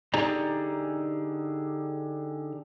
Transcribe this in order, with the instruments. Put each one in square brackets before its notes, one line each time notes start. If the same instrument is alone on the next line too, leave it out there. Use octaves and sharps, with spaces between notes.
[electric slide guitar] D3 D#4 G4 G#4 D5 A#5